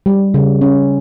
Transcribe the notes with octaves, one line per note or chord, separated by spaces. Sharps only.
G3
C#3
C#4